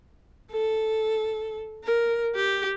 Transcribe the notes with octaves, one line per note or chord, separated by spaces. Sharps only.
A4
A#4
G4